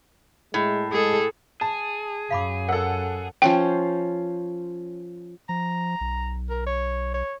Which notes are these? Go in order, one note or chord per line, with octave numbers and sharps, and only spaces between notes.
A2 G#3
G#3 G#4 A4
G#4 A5
F#2 F5 B5 D6
A4 A#4 F#5
F3 C#4 C5 G5
F3 A#5
B1
A#4
C#5
C#5